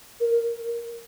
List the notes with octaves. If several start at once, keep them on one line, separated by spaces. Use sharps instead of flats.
A#4